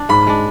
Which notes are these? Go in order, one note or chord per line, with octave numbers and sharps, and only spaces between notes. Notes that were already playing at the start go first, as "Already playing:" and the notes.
Already playing: D4
G#2 B5
G#3 D4